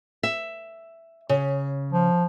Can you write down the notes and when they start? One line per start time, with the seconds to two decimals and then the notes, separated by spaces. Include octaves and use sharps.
0.23 E5
1.29 C#3
1.93 F3